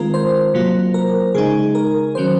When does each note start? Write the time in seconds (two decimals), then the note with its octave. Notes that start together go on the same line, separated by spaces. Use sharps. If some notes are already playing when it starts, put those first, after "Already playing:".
Already playing: D#3 G#3 C4 F4 A#4
0.14 C5
0.54 C3 F#3 A#3 F4
0.94 A#4
1.35 C#3 G#3 D#4 G#4
1.75 A#4
2.15 D#3 F#3 C#4 C5